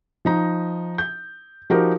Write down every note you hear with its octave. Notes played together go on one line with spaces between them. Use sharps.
F3 D#4 A#5
G6
F3 D#4 F#4 G4 A#4